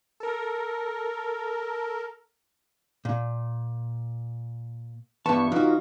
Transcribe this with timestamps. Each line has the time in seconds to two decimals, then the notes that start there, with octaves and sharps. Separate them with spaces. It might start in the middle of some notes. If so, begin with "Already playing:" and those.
0.20 A4 A#4
3.05 A#2
5.26 G2 E3 B3 B4 A5 C#6
5.52 E3 D#4 F4 F#4